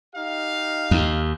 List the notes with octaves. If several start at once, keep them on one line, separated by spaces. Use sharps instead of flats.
D#4 G4 F5
D#2